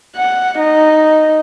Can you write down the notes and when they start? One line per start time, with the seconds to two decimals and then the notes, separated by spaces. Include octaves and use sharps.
0.16 F#5
0.59 D#4